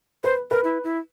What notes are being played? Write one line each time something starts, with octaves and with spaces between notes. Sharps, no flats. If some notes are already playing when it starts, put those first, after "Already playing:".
B4 C5
A#4 B4
E4
E4